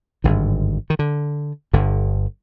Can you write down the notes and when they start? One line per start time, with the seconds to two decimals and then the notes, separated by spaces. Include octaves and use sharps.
0.24 G#1 G2 D3 D#3
0.90 D#3
0.99 D3
1.73 G1 G2 D3